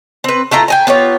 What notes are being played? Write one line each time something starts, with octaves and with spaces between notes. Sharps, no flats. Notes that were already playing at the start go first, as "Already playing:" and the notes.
C4 B4
A3 E4 F4 A#5
G5 G#5 A#5
B3 F4 G4 C#5